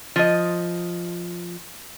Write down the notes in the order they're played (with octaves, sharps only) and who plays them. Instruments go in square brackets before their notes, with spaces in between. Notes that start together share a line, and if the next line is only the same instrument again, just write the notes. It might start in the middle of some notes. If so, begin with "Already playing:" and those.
[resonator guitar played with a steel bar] F3 D#5